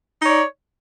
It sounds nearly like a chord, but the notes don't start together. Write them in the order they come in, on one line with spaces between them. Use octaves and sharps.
D#4 C#5 D5